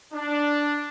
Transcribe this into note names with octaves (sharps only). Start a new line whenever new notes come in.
D4